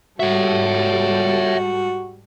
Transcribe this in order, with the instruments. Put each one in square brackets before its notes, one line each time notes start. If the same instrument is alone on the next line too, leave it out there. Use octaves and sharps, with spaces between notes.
[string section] G#2 G3 A4 [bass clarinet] F#4 [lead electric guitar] C#5 E5